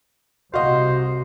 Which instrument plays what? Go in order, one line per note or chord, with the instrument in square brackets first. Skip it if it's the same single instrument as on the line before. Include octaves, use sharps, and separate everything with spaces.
[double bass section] C2 C3 [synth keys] F#4 [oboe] C5 [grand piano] D#5 F5